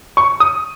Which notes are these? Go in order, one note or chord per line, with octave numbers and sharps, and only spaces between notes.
C#6
D#6